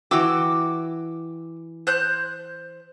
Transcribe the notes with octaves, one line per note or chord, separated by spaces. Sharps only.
E3 F#4 G5 D6 E6
C5 F#6 G6